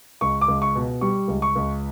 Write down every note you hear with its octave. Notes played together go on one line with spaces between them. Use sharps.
C#2 C#6
D6
C#2
C#6
B2
G3 C#6
C#2
C#6
C#2